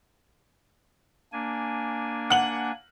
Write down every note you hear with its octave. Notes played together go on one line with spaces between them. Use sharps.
A#3 D4 G#5
F#5 F#7